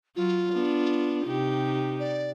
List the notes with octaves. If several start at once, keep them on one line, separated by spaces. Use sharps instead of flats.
F#3 F4
B3 D4
C3 D#4 G4
D5